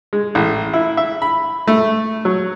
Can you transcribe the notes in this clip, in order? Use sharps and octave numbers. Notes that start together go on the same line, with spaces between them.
G#3
A1
E4
E5
B5
A3
F#3